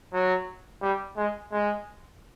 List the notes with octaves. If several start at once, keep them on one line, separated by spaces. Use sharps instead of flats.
F#3
G3
G#3
G#3